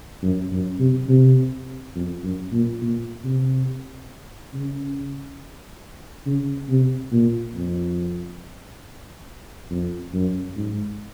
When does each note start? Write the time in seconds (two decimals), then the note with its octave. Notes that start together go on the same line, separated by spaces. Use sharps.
0.23 F#2
0.52 F#2
0.80 C3
1.09 C3
1.95 F2
2.24 F#2
2.53 A#2
2.81 A#2
3.24 C3
4.54 C#3
6.26 C#3
6.69 C3
7.12 A#2
7.55 F2
9.71 F2
10.14 F#2
10.57 G#2